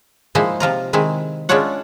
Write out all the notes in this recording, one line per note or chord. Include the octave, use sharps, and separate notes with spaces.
F3 G#3 A#3 D#4 E4 C5
C3 F3 F4 A#5
D#3 G#3 C4 E4
G#3 C#4 D4 F4 C#5 F#5